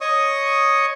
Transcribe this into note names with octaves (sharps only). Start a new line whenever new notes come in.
C#5 D#5 C#6 D#6